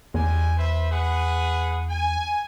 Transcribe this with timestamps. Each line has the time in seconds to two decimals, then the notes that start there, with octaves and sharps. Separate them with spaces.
0.14 E2 G3 G#3 G#5
0.58 B4 C5 E5
0.91 G#4 B4 F#5
1.90 G#5